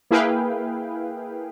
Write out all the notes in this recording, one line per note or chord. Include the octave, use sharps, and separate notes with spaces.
A#3 E4 G#4 B4 F5 G5